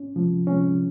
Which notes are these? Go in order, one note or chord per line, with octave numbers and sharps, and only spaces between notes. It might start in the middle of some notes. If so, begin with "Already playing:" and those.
Already playing: C#4
C3 F3 G#3
C3 F3 G#3 C#4